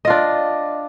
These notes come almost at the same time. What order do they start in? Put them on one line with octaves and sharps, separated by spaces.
D#5 F4 D4